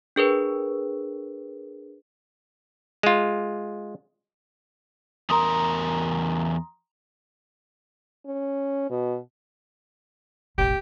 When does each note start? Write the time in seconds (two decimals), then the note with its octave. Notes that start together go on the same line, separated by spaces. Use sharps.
0.16 D4 G#4 A#4 B4
3.03 G#3 F4
5.30 E2 A#4 A#5 C6 D#6
8.26 C#4
8.90 B2
10.58 E1 A1 G4